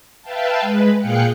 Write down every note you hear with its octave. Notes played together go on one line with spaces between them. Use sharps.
B4 E5 F5 G5 A5
G#3 B4
A#2 G#4 F5 G5 F#6 C#7